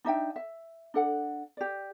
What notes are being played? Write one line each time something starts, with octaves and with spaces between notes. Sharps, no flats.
D4 D#4 E5 G5
E5
D4 A4 F#5
G4 D5